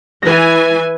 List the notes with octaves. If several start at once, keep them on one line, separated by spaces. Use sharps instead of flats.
E3 B4 G#5 A#6